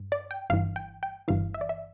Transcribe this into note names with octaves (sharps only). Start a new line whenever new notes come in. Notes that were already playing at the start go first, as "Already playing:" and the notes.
Already playing: G2
D5
G5
G1 G2 E3 F5
G5
G5
G1 G2 E3 F5
E5
D5
E5